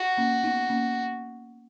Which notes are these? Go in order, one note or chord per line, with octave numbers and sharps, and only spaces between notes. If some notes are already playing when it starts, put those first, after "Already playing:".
Already playing: F#4
A#3 C#4
B3 D#4
A#3 C#4